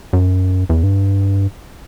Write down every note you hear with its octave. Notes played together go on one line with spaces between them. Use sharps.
F#2
E2
G2